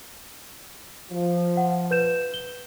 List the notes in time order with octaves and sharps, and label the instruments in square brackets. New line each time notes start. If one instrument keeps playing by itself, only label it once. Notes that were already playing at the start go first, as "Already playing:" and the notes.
[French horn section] F3
[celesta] F#5
B4 G6 E7
G7